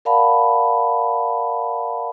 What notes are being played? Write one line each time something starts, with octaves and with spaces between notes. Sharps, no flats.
A#4 D5 F5 F#5 A5 B5